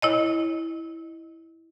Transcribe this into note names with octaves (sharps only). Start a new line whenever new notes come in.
E4 C#5 D#5